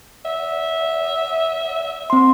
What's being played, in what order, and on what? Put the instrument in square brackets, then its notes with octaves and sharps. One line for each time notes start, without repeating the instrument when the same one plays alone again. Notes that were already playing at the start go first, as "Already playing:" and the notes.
[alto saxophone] E5
[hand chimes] C4 C6